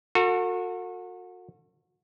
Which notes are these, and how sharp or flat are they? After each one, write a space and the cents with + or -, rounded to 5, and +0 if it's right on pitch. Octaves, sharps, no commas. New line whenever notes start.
F#4 -30 A4 +40